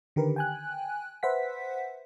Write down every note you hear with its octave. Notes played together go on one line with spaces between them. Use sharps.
D3 D#3 G4 A#4 B4
G5 G#5 F#6
B4 C5 E5 F#5 B6